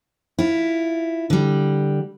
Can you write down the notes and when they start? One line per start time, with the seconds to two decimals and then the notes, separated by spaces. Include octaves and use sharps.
0.38 E4 F4
1.30 D3 G3